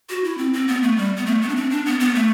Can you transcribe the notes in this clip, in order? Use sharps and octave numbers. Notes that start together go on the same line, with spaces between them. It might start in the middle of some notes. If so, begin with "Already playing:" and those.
F#4
E4
C4
C4
B3
A3
G3
B3
A3
B3
D4
C4
D4
B3
B3
A3